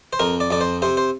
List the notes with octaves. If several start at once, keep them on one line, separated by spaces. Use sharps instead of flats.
C5
F2 A#4
D5
F2 D5
C5
C3 C5
C5